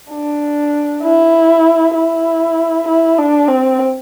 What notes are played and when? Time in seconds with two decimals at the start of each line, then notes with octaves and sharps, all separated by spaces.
0.12 D4
1.04 E4
1.95 E4
2.88 E4
3.18 D4
3.48 C4